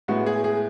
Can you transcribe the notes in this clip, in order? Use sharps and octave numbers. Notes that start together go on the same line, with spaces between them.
A2 G#3 B3 F#4
G#4
G#4